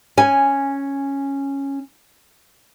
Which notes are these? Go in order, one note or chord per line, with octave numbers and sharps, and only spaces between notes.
C#4 G#5